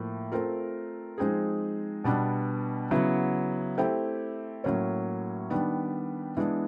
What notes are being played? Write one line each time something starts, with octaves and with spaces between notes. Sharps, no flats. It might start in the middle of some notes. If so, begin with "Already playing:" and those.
Already playing: A2 F3 A#3
A3 C4 F4 A#4
F3 G#3 C4 D#4 G#4
B2 G3 B3 D4
C#3 F#3 B3 E4
A3 C4 E4 G4
A2 F#3 A#3 C#4
D#3 G3 B3 D4
E3 G#3 B3 D4